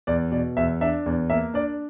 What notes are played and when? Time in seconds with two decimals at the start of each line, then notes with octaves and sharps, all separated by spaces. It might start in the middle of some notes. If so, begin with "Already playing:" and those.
0.07 E2 D5
0.32 B2 D5
0.57 E2 E5
0.81 D4 E5
1.06 E2
1.30 A#3 E5
1.54 D4 D5